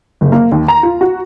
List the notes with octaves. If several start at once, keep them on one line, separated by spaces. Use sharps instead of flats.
F#1
A#3
D#2
A#5
F4
F#4